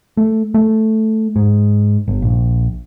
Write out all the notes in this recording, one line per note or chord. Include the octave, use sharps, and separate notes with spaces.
A3
A3
G#2
G1
A#1